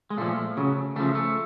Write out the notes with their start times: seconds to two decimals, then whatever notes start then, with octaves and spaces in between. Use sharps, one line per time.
0.10 G#3
0.17 A#2 F3 A3
0.57 C#3 F#3
0.96 C#3 F3 A3
1.15 A3